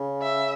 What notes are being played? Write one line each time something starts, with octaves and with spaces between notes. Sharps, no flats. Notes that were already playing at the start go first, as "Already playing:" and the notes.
Already playing: C#3
E5